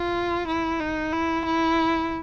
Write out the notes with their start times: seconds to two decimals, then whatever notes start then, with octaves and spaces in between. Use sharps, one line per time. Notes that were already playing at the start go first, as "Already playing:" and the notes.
Already playing: F4
0.47 E4
0.80 D#4
1.12 E4
1.45 E4